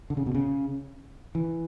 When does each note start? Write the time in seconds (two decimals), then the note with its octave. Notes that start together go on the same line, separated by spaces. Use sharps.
0.10 D3
0.17 C#3
0.26 B2
0.35 C#3
1.35 E3